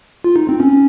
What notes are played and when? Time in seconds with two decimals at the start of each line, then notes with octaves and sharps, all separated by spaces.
0.24 F4
0.36 D#4
0.49 C4
0.60 C#4